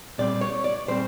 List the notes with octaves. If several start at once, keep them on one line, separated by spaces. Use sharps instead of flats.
A#2 G3 C4 D5
C#5
D5
A#2 G3 C4 C5